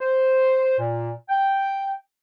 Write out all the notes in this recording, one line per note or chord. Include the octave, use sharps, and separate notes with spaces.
C5
A#2
G5